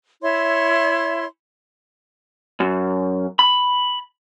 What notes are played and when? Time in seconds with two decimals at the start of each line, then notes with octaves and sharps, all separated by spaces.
0.22 E4 C#5 E5 C6
2.60 F#2
3.39 B5